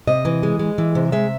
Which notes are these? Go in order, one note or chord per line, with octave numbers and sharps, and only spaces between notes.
C3 D#5
E3
G#3
G#3
E3
C3
G#3 E5